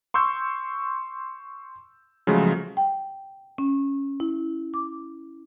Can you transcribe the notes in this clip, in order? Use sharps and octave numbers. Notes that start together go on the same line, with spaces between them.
C6 C#6 E6 G6
C#3 F3 F#3 G#3 A3
G5
C#4
E4
D6